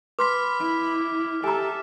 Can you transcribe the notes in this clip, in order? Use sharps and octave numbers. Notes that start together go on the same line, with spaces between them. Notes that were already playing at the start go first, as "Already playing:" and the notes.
B4 B5 C6 D6 F6 B6
E4
G4 A4 E5 G#5 A#5